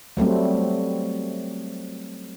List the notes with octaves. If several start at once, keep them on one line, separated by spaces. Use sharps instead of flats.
F#3 G3 A3 C4